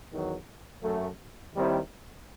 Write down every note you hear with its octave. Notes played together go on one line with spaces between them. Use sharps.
E2 D#3 F#3
F#2 F#3 A3
D#2 D#3 G3 C4 E4